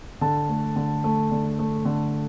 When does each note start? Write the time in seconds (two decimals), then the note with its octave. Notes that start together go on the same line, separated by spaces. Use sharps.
0.21 D3 A5
0.49 A3
0.76 D3
1.04 A3
1.31 D3
1.59 A3
1.85 D3